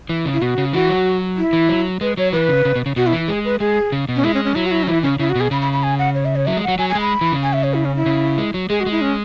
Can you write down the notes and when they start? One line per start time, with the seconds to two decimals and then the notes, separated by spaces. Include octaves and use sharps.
0.09 E3
0.26 C#3
0.33 E4
0.42 B2 F#4
0.58 C#3
0.73 E3 F#4
0.89 F#3
1.37 E4
1.53 E3
1.69 F#3
2.01 G#3 B4
2.17 F#3 C#5
2.33 E3 B4
2.49 C#3
2.65 C#3
2.76 B2
2.86 C#3
2.96 B2 F#4
3.07 E4
3.13 E3
3.28 G#3 G#4
3.45 B4
3.60 G#3 G#4
3.92 C#3
4.09 B2
4.16 C#4
4.24 G#3 E4
4.35 C#4
4.45 C#4
4.55 F#3 E4
4.66 F#4
4.71 E4
4.83 C#4
4.87 E3 E4
5.03 C#3 C#4
5.19 C#3 E4
5.30 F#4
5.35 B2
5.40 G#4
5.51 C#3 B5
5.61 B5
5.73 B5
5.83 G#5
5.99 F#5
6.15 C#5
6.25 E5
6.36 C#5
6.46 F#3 E5
6.57 G#3
6.63 F#3 F#5
6.78 F#3 G#5
6.89 G#5
6.95 G#3
7.00 B5
7.21 E3
7.32 C#3
7.43 G#5
7.53 E5
7.64 C#5
7.74 E4
7.85 C#4
7.96 E4
8.06 C#3
8.38 G#3
8.54 F#3
8.70 G#3 G#4
8.80 F#4
8.86 G#3
8.92 E4
9.01 C#4